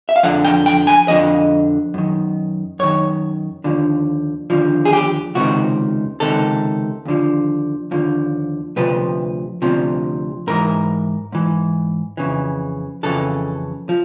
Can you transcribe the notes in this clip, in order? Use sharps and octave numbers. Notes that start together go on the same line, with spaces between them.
E5
F5
F2 D3 F3 F#5
G5
G5
G#5
F2 D3 F3 D#5
F#2 D#3
F#2 D#3 C#5
D#2 D3 F3
D#2 D3 F3
G#4
G4
C#2 C3 D#3 F#4
C#2 C3 D#3 A4
D#2 D3 F3
D#2 D3 F3
D2 C3 F3 B4
D2 C3 F3
G#2 E3 A#4
G#2 E3
F2 C#3 E3
F2 C#3 E3 A4
F3